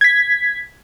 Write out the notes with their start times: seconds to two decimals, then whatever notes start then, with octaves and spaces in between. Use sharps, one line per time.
0.01 G#6 B6